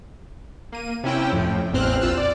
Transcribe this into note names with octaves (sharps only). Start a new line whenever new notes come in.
A#3 D#7
C3 C#4 E4 G5
F2 A2
A1 E2 C4 C5 F6 F#6
A#1 F4 E6 F#6
D5